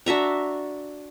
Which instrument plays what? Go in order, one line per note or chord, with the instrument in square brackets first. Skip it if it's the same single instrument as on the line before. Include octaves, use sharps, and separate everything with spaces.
[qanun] D4 F#4 E5 A#5